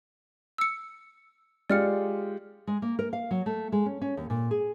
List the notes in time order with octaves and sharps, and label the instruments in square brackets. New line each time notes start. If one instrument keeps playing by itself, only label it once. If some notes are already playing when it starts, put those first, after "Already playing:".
[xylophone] E6 C#7
[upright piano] G#3 F4 G4 [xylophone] D5 F6 C#7
[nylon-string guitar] G#3
A#3
A#4
F5
F#3
A3
G#3
C#4
C#4
D#2
A#2
G#4